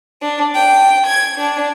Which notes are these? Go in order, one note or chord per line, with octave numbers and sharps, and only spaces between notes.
D4
G5
G#6
D4